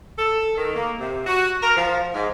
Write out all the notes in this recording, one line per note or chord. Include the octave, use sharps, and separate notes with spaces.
A4
D#3
A#3
C3
F#4
A#4
F3
G#2